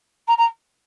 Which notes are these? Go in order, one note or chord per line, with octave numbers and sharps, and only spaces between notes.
A#5
A#5